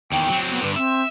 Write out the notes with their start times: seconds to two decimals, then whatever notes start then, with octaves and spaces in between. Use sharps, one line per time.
0.12 E2 D#3 G5
0.29 F#3 C4
0.51 B3
0.62 G2 D3 B4
0.76 C4 E5